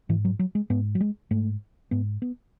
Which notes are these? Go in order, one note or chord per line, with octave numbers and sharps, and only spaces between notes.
G#2 E3
F#3
F#3
G#3
G#2 B3
F#3
G#3
G#2 A3
G#2 B3
B3